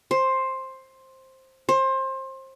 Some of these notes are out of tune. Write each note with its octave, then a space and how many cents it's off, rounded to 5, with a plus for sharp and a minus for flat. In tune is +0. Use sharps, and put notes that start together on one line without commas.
C5 +10
C5 +25